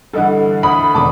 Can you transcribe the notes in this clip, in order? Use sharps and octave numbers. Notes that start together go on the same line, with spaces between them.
G2 D3 E3 A4 D#5 F#5
D2 B5 D#6
E1 D3 A5 D6 D#6